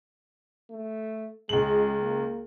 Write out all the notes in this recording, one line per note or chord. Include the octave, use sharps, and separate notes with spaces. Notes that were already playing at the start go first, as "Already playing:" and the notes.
A3
C#2 G#3 F#7
A#3